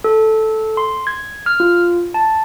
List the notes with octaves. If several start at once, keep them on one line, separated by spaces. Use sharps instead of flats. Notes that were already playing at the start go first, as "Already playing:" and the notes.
A4
C6
G#6
F6
F4
A5